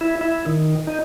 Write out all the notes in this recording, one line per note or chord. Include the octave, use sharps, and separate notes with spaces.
E4
E4
D#3
D#4